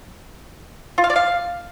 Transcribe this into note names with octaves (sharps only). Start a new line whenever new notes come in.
F4
F5
D5
F5